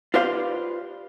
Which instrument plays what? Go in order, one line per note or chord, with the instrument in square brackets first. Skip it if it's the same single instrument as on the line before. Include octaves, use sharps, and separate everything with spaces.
[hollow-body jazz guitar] F4 G4 B4 C5 D5 F5